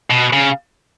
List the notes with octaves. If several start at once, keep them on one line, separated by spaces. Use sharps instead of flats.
B2
C#3